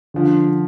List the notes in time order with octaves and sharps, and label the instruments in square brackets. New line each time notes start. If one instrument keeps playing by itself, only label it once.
[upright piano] D3 F3